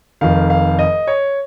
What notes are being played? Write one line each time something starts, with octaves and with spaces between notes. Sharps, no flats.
F1 F2 D#3 F5
F5
D#5
C#5